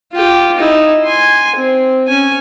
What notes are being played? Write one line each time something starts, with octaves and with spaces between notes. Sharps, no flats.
F4 G4
D#4 E4
G#5 C6
C4
C#4 G#5